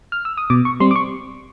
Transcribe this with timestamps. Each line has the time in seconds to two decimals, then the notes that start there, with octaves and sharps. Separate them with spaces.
0.12 F6
0.25 E6
0.37 D#6
0.50 B2 D6
0.65 C#6
0.80 G3 C4 C6
0.91 D6
0.96 C#6